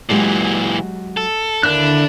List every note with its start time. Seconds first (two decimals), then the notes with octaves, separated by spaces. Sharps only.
0.09 A#2 E3 F#3 G#3 G4
1.17 A4
1.63 D#2 D3 D4 E4 F#6